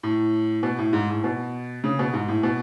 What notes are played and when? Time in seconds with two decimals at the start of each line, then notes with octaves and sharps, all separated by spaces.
0.03 A2
0.63 B2
0.79 A2
0.93 G#2
1.09 A2
1.24 B2
1.84 C#3
1.99 B2
2.13 G#2
2.28 A2
2.43 B2